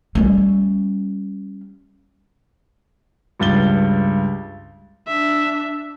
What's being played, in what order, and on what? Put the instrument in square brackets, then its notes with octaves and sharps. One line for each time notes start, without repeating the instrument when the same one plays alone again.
[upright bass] G3 C#4
[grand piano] C#2 G2 A6 G7
[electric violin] D4 E5